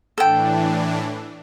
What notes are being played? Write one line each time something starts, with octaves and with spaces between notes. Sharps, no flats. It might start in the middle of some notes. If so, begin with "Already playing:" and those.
A2 E3 D4 A4 G5